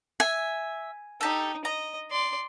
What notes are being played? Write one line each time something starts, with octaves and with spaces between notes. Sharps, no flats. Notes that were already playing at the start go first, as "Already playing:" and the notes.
E5 G#5
D#4 G4 A4
D#5 A#5
D5 C6